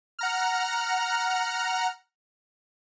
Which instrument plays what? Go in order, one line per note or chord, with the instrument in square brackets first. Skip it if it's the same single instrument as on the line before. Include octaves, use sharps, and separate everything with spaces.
[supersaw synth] F#5 A#5 F6